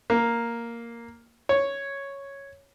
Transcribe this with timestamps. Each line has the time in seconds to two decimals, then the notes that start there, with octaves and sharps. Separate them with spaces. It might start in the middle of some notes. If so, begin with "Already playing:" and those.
0.10 A#3
1.49 C#5